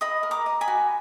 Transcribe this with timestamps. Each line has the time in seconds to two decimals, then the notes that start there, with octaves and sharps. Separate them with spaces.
0.01 D#5 B5 D#6
0.23 A#4
0.31 A#5 D6
0.46 D#5
0.61 G#5 B5
0.68 F#4